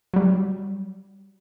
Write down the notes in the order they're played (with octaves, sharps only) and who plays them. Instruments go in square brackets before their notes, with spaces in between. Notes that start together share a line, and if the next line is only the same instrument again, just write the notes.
[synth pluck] F#3 G3